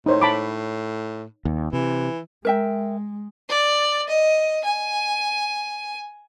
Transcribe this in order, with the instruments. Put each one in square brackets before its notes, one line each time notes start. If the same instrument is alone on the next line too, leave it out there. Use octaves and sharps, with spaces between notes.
[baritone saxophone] A2 [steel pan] D#4 C5 C#5
[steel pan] A5 B5 D6
[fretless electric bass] D#2
[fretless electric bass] C3 [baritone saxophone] E3
[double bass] G#3 [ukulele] A#4 E5 G5
[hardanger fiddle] D5
D#5
G#5